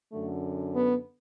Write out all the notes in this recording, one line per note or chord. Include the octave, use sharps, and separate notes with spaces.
F#2 D3 A3
B3